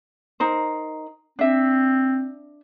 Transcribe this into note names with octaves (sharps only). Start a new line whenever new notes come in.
D#4 A#4 C5
C4 D4 E5